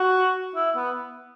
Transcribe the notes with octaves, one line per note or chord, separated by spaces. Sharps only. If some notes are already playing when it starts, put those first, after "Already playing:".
Already playing: F#4
E4
B3